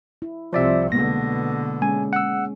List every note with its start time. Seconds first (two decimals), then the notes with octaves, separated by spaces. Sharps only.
0.22 E4
0.53 C2 C3 F3 D5 E5
0.92 B2 D3 G#3 A#3 B3 A#6
1.82 G#3 C#4 G#5
2.13 F#5 E6